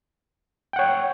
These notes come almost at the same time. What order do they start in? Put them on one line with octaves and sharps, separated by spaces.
G5 F#5 C#5